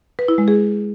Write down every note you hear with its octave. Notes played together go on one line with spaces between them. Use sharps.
B4
E4
G#3
G#4